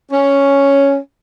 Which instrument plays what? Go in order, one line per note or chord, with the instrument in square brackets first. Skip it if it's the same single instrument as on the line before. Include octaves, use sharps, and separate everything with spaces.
[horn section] C#4